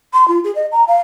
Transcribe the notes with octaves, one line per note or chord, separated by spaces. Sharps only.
C6
F4
G#4
D#5
A#5
F5